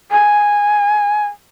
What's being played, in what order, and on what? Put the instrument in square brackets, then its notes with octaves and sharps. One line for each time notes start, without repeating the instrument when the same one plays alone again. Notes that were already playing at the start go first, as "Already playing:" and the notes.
[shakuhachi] G#5